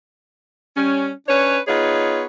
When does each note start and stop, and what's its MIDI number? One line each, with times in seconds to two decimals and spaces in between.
0.76 1.09 55
0.76 1.09 61
1.27 1.57 61
1.27 1.57 62
1.27 1.57 71
1.27 1.57 73
1.67 2.23 59
1.67 2.23 63
1.67 2.23 65
1.67 2.23 68
1.67 2.23 73